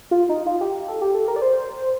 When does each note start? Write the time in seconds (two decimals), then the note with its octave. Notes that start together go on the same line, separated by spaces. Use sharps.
0.11 F4
0.29 D#4
0.46 F4
0.61 G4
0.88 A4
1.01 G4
1.14 A4
1.28 A#4
1.36 D5
1.42 C5